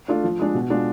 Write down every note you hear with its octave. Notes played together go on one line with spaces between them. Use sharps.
A3 D4 F4
F3
G#3 D4
B2
G#3 D4 F4